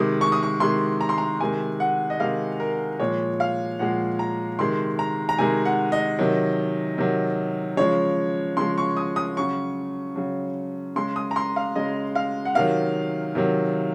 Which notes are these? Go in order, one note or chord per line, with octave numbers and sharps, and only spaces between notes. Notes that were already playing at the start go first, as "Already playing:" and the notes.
Already playing: C3 D#3 G#3 D#6
C#6
D#6
C#6
C3 D#3 G#3 C6
A#5
C6
A#5
C3 D#3 G#3 G#5
F#5
D#5
C3 D#3 G#3 F5
A#4
A#2 F3 G#3 C#5
F5
A#2 F3 G#3 F#5
A#5
C3 D#3 G#3 C6
A#5
A#5
C3 D#3 G#3 G#5
F#5
D#5
C3 D#3 F#3
C3 D#3 F#3
C#3 F3 G#3 C#5
C#3 F3 G#3 C6
C#6
D#6
D#6
C#3 F#3 C#6
C#3 F#3
C#3 G#3 C6
D#6
A#5
C6
F5
C#3 G#3 D#5
F5
F#5
C3 D#3 F#3 F5
C3 D#3 F#3